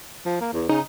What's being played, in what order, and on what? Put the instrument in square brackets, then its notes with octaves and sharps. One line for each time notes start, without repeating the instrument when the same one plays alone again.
[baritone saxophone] F3
A#3
E2
[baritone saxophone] C#3 [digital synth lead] D#4